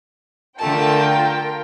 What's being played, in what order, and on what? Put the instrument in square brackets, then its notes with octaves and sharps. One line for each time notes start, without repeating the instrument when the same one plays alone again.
[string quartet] D3 A3 A5 [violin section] F4 A#4 G5